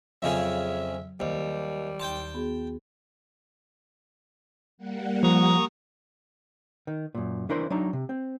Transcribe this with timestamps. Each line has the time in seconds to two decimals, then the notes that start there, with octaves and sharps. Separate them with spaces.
0.23 F2 C#3 F#3 G#4 E5
1.20 D#2 D#3 G3 C5
2.00 D#2 G5 A5 C6
2.34 B3 F#4 G#4
4.78 G3 A#3 F#5
5.23 F3 A#5 C#6 D#6
6.87 D#3
7.15 F#2 A#2
7.49 E3 D4 E4 A#4 C5
7.70 F#3 D4 D#4
7.93 C3
8.09 C4